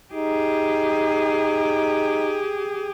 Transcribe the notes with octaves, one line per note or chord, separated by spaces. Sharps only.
D#4 G4 G#4